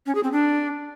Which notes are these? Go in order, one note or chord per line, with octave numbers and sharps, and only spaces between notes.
C#4
G#4
C4
D4